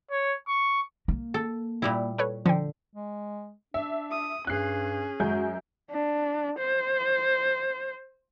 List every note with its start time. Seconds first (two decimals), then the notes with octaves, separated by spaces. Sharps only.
0.11 C#5
0.48 C#6
1.08 A#3
1.34 A4
1.82 A#2 G3 E4
2.18 A4 B4 C#5
2.46 D3 F3 G5
2.95 G#3
3.74 D4 E5
4.11 D#6
4.47 G2 C#4 G#4 F#6 C7
5.20 F#2 G#3 F#4 G6
5.91 D4
6.59 C5